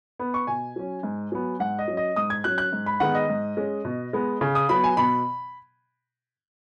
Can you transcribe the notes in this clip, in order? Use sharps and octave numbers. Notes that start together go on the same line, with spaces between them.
B3
C#6
B2 G#5
F#3 C#4
G#2
F#3 B3
G#2 F#5
D#5
F#3 C#4
D#5
G#2 D#6
G#6
F#3 C#4 F#6
F#6
G#2
B5
D#3 G#3 B3 F#5
D#5
G#2
G#3 C#4
B2
G#3 B3
C#3
D#6
F#3 B3 B5
G#5
B2 B5